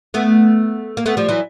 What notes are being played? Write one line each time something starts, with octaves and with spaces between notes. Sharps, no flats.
A3 B3
A#3
A3 B3
F3 G3
E3 F#3